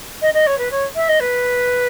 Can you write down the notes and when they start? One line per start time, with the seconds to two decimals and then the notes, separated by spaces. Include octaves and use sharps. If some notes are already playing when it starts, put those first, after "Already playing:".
0.21 D#5
0.34 D#5
0.46 C#5
0.58 B4
0.71 C#5
0.95 E5
1.08 D#5
1.20 B4